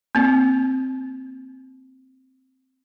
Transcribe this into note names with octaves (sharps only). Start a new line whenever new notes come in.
A#3 C4